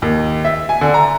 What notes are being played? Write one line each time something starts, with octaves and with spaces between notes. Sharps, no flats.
D#2
E5
G#5
D3
A#5